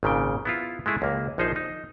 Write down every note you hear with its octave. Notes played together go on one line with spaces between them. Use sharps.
G#1 A#2 C#3 G5
B3 E4 F4
G#3 A3 E4 G#4
C#2 A#3
A#1 F3 D#4 G#4 C5
D#4